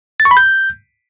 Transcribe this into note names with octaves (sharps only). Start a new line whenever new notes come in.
A6
C#6
B5
G6